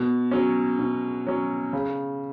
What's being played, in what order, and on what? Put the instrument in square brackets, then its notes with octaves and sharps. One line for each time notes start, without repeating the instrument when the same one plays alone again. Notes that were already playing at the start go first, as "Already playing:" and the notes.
Already playing: [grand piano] B2
F#3 C#4
B2
F#3 C#4
C#3